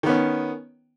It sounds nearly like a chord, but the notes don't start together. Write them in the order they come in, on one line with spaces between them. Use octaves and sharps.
D#3 B3 C#4